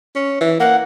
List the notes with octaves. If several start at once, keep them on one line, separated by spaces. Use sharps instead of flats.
C#4
E3
A#3 F#5